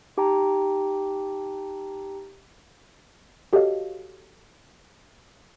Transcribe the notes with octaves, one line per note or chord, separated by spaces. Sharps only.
D#4 G4 G5 A5 A#5
F#4 G4 A4 C#5 D#5 F5